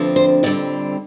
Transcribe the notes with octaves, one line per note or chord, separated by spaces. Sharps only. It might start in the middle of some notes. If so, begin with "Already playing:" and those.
Already playing: D2 D3 F3 C4
C5
F2 D3 G3 C4 D5